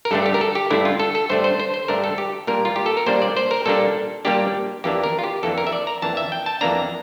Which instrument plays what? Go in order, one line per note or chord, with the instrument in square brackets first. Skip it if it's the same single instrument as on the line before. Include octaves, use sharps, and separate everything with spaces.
[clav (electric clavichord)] A#4
G2 D3 A3 D4 A4
G4
A#4
A4
G4
G2 D3 A3 D4 E4
F4
A4
A4
G2 D3 A3 D4 C5
C5
C5
C5
G2 D3 A3 D4 A#4
A4
G4
A#2 G3 A#3 D4 A#4
F4
G4
A4
A#4
A#2 G3 A#3 D4 C5
D5
C5
A#4
A#2 G3 A#3 D4 A4
A#2 G3 A#3 D4 G4
F2 E3 A#3 D4 G4
A#4
F4
G4
F2 E3 A#3 D4 A4
A#4
E5
D5
A#5
F2 E3 A#3 D4 A5
E5
G5
A5
F2 E3 A#3 D4 A#5